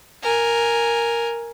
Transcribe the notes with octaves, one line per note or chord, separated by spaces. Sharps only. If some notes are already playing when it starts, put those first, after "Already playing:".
A#4 G#5